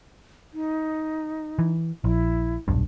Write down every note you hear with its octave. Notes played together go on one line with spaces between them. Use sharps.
D#4
E3
A#1 E4
D#1 B1 G2